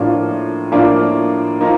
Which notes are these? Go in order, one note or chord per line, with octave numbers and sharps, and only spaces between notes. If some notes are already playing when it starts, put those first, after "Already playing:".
Already playing: A2 F3 A#3 D4 F4
A2 F3 A#3 D4 F4
F3 A#3 D#4